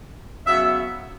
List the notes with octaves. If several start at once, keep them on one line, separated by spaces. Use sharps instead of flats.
C#3 F#3 B3 E5